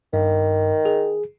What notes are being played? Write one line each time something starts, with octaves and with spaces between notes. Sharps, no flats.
G2 D#3
G#4